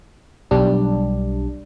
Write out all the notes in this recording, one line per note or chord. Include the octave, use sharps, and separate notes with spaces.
B1 G3 D4